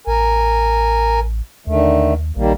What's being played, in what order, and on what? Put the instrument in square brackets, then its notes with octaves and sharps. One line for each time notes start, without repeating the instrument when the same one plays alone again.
[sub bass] A1 [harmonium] A#4 G#5
[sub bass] D#2 [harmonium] D3 D#3 A3
[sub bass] A#1 [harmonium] D#3 G3 A#3